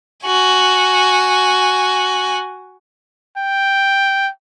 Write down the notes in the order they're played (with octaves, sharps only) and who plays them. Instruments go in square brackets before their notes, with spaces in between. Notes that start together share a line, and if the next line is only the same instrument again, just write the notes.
[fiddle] F#4 G#5
[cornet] G5